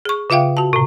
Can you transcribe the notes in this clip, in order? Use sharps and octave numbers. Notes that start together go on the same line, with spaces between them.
G#4 C#6
C#3 F4 E5 F5 G5
F#4 A5
A2 C3